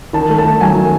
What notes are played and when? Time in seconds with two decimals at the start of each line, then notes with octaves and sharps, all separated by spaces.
0.13 D#3 A5
0.29 A3
0.38 A5
0.45 D#3
0.61 F#3 G#5
0.76 D#3